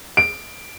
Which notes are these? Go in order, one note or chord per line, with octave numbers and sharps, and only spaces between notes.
D7